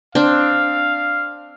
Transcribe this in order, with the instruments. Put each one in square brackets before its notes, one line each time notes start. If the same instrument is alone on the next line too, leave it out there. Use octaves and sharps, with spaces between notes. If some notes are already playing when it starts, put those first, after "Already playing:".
[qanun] C4 D4 [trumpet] F5